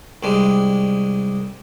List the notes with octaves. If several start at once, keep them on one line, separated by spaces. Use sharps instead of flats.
C2 G3 G#3